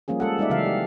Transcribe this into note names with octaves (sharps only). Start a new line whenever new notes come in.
F3 G3 A#3 C#4 G#4
G#3 A4 F#5
G3 G#3 D#4 D5 E5
C#3 E3 F#3 E5 F5
G4